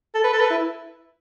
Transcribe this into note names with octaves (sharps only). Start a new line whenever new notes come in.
A4
B4
A4
B4
E4